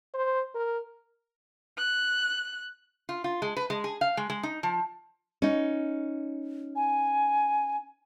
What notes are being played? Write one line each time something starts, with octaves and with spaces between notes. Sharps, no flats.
C5
A#4
F#6
F4
F4
G#3
B4
G#3
G#4
F5
G#3
G#3
D#4
F3
C#4 D#4
G#5